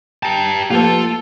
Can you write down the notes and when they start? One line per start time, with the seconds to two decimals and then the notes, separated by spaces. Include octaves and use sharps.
0.23 G4 G5 A5 A#5
0.70 F3 A3 A#3 F4 G4 A4 B4